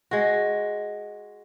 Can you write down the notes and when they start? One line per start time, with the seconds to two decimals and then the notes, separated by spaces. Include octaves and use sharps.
0.11 G#3 F#4